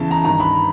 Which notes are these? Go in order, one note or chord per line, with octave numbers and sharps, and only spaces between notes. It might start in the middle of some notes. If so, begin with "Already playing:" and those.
Already playing: E2 C#3 E3 A5
A#5
G2 D#3 A#5
B5